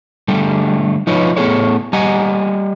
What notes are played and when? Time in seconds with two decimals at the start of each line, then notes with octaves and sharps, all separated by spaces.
0.28 D3 G3 A3
1.07 F3 D#4 F4 B4 C#5
1.37 A2 B3 G#4 A4 C#5
1.93 G3 D#5 F#5 G#5 A#5